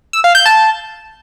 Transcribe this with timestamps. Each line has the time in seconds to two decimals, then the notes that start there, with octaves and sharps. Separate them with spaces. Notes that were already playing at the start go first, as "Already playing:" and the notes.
0.13 E6
0.24 F5
0.35 G6
0.46 A5